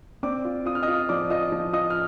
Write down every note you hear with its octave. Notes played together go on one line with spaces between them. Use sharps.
C4 D5 D6
F4
F4 D#6
F6
D#5 D#6
F4
F3 D5 D6
F4 D#5 D#6
F3
F4 D#5 D#6
F6